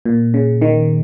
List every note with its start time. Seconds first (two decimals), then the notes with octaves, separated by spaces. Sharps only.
0.05 A#2
0.34 C#3
0.62 D#3